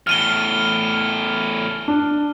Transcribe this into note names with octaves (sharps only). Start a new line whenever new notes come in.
E2 A2 F6 D#7 G7
D4